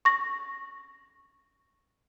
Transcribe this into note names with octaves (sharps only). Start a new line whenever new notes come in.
C#6 A#6